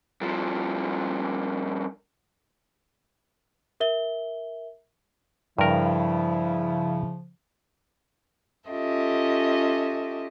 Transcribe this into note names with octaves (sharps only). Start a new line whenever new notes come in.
G2 F3
A#4 E5 G7
G2 C#3 F3 E4 A#4
C#4 F4 G4 A4 D#5 E5